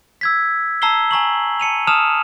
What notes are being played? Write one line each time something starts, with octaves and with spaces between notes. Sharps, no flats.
E6 G#6 B6
A5 A#5 E6 C7 G7
G#5 A#5 C#6 F#7
A5 C#7 D#7 F7
A5 D#6 F6 E7 F7